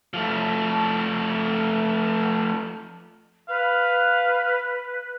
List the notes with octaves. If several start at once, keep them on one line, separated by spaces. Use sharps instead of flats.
F3 A3
B4 F5